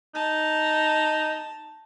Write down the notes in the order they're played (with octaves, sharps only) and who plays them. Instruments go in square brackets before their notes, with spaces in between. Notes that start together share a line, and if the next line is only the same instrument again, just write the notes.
[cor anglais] D#4 [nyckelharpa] A5